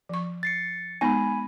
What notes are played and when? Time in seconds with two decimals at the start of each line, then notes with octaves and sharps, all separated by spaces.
0.09 F3 C#6
0.43 A6 C7 C#7
1.01 G#3 B3 D#4 G#5 B5